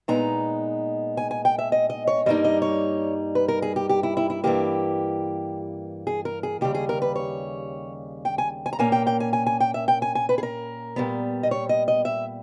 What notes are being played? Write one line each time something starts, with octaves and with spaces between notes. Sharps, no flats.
A#2 G#3 B3 D#4 A#5
G#5
G#5
G5
E5
D#5
D#5
C#5
G2 G3 A#3 D#4 D#5
D#5
C#5
B4
A#4
G#4
G4
G4
E4
E4
E4
G2 E3 A#3 G4
G#4
A#4
G#4
D#2 C#3 G3 G4
G#4
A#4
B4
C#5
G5
G#5
G#5
A#5
A#2 A#3 C#4 G#5
G5
G5
G#5
G#5
G#5
G5
E5
G5
G#5
G#5
B4
G#4
A#4
A#2 G3 B3
D#5
C#5
D#5
D#5
E5